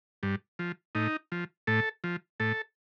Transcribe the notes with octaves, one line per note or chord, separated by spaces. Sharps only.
G2
F3
A2 D#4
F3
A2 A4
F3
A2 A4